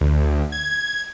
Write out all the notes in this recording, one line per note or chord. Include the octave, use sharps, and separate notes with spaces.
D2
G#6